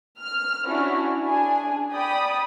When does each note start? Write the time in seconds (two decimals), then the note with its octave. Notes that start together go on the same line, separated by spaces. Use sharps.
0.20 F6
0.65 C#4 D4 E4 F#4
1.25 D4 G#4 G#5
1.92 D5 G5 B5 D#6